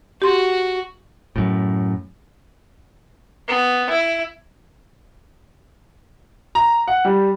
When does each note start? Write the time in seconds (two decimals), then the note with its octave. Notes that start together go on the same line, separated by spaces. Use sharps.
0.22 F#4 G4 C6
1.36 F#2 A2
3.48 B3
3.90 E4
6.55 A#5
6.88 F#5
7.05 G3